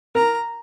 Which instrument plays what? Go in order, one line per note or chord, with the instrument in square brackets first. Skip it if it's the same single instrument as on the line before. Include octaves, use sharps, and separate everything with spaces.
[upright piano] A#4 [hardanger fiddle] A#5